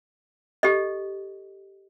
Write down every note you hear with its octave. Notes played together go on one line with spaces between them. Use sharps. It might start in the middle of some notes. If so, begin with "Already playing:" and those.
G4 A4 D#5